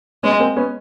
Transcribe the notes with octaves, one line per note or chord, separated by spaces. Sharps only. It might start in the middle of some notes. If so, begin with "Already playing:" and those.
G#3 B3 C#4
A#3 C4
B3 C#4